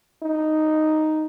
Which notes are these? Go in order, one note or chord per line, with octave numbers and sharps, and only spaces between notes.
D#4